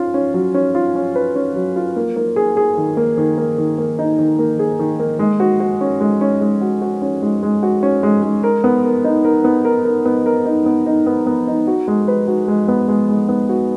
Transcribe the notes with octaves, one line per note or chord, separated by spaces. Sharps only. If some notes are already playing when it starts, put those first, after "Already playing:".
Already playing: C#4 F4
C#4
F#3
C#4
F4
C#4
B4
C#4
F#3
F4
A#3
A#3
G#4
G#4
D#3
A#3
D#3
A#3
D#3
A#3
D#4
D#3
A#3
G#4
D#3
A#3
G#3
F#4
F#4
C#4
G#3
C#4
G#3
F#4
F#4
C#4
G#3
G#3
F#4
C#4
G#3
G#3
A#4
B3
A#4
D#4
A#4
B3
A#4
A#4
B3
A#4
D#4
B3
D#4
B3
B3
D#4
F#4
G#3
B4
F#4
G#3
B3
G#3
G#3
B3
F#4